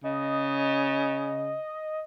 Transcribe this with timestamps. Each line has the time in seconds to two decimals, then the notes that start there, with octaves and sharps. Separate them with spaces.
0.04 C#3 D#5